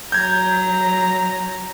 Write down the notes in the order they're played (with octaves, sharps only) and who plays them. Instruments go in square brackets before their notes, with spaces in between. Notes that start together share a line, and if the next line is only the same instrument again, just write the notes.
[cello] F#3 [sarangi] A#5 [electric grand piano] G6 G#6